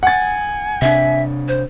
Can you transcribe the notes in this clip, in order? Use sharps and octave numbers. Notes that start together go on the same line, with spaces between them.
F#5 G#5 A6
C3 D4 E5
C5